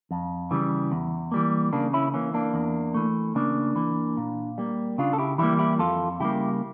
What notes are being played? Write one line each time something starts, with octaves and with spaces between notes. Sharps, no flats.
F2
C#3 E3 G3
E2
E3 G3 A#3
C#3 A#3 D4
C#4 E4
E3 A#3 C#4
A#3 D4
E2
E3 A3
C#3 A#3 D4
E3 A#3
A#2
G3 A#3
C#3 D4 F4
A4
E4 G4
E3 G3 A#3 E4 G4
E4 G4
F2 F4 A4
C#3 G3 A#3 E4 G4